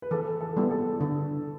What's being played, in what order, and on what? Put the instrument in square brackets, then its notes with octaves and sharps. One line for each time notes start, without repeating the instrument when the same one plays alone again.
[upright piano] B4
[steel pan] E3 [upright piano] A4
[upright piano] A4
[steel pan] G3 B3 E4
[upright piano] A4
[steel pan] D3